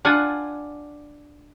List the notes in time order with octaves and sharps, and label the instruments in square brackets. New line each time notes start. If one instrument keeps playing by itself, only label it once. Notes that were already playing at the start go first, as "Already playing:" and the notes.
[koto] D4 F4 F#5 G#5